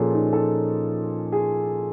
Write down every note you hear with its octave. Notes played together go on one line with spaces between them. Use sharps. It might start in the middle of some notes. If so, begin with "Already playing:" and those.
Already playing: A#2 F3 A#3 C#4 G#4 A4
D#4
A4
G#4